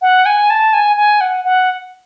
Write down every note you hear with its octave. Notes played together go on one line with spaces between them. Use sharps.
F#5
G#5
A5
G#5
G#5
F#5
F#5